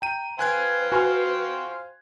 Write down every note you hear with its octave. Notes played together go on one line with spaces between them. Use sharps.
G5 A#5 D#7
B4 C5 F5 G5 G#5 F#6 G#6
F#4 G#5 C6 F6